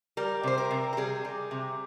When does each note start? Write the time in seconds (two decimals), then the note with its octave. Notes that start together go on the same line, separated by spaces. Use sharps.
0.17 G3 A#4
0.43 C3 C5
0.58 A#4
0.71 C3
0.93 A#4
0.97 G3 G#4
1.25 G3
1.51 C3